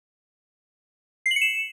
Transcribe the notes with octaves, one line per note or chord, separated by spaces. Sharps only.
C7
F#7
C#7
E7